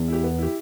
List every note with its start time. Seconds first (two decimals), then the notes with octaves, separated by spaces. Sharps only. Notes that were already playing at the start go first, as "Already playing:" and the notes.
Already playing: E2
0.08 E4 G4
0.23 B3
0.38 E4 G4